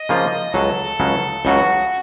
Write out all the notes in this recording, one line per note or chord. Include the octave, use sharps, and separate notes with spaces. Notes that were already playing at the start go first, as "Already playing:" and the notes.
Already playing: D#5
C#3 F3 A#3 F4
C#2 C#3 F#3 A4
C#2 C#3 F#3
C#2 C#3 F#3 F#4